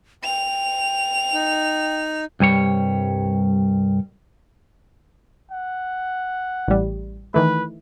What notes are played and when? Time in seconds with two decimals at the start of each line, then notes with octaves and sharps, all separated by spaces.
0.24 G5 F7
1.33 D#4
2.40 C2 G2 G3 C#5
5.51 F#5
6.68 A1 G3
7.34 D#3 E3 A3 B4